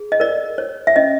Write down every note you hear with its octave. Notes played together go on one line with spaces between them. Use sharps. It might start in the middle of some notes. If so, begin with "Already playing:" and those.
Already playing: G#4
D#5
A#4 D5
C#5
E5
C#4 D#5